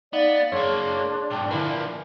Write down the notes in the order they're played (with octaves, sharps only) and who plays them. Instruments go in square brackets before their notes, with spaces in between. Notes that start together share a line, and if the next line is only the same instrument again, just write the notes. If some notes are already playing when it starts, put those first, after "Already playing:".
[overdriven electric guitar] B3 [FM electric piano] D#4 [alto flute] D5 [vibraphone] D#5 F5
[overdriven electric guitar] F#2 A#3 [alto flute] D4 [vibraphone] G#4 C6 [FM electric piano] C#5
[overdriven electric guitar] B1 G#2 [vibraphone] G5
[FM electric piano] D3 E4 B4 [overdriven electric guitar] F3 A#3 [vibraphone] G#5